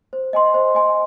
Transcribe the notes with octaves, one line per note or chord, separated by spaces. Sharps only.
C5
D#5 G#5 C6
C5
D#5 G#5 C6